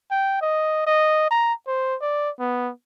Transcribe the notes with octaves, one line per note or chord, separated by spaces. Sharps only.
G5
D#5
D#5
A#5
C5
D5
B3